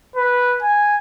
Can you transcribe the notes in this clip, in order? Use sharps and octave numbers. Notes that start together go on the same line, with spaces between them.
B4
G#5